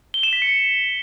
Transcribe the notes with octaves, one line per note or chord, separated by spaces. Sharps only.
G7
E7
B6
C#7